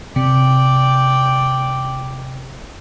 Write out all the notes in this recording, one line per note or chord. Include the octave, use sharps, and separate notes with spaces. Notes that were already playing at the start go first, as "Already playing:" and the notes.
C3 D5 G5